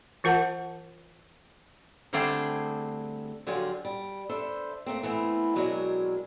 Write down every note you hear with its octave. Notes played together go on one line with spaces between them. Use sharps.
E3 F4 A#4 F#5 A5
D3 G3 A3 C4 D4 G#4
D3 F3 F#3 F4 G4 G#4
G3
D4 A4 B4 C5 E5
A3 A#3 C4
E3 A3 B3 C4
B2 F#3 G#3 C4 D4 A#4